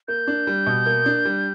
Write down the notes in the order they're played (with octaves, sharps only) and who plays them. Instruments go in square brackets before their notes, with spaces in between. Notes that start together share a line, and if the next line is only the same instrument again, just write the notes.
[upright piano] A#3 [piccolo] G6
[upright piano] D4
G3
B2
A#3
D4
G3